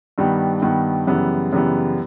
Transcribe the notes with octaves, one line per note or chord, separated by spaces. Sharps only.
G2 D#3 G3 B3
G2 D#3 G3 B3
F#2 C#3 E3 G3 B3
F#2 C#3 E3 G3 B3